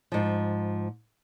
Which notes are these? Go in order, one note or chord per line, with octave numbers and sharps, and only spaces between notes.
G#2 F3